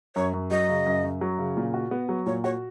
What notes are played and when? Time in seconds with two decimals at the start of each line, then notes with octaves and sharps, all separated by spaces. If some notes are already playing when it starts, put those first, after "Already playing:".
0.16 F#2 C#5
0.34 F#2
0.51 F#3 D#5
0.69 C#3
0.86 F#2
1.04 F#2
1.21 F#3
1.39 C#3
1.57 A#2
1.74 F#4
1.91 B3
2.09 F#3
2.26 A#2 C#5
2.44 F#4 C#5